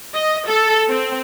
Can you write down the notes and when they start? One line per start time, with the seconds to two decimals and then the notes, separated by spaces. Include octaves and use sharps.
0.14 D#5
0.48 A4
0.89 C4